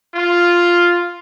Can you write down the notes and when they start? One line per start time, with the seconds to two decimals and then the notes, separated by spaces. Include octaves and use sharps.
0.15 F4